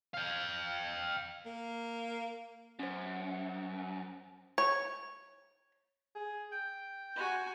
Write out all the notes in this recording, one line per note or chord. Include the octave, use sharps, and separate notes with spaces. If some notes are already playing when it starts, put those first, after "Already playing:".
F5 G5
A#3
F#2 C#4 C5
C#5
G#4
G5
F#4 G#5